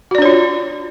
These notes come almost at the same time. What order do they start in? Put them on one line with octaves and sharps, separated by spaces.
F#4 D5 D4 C#5 F4